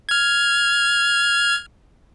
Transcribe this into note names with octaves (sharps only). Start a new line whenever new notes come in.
F6 G#6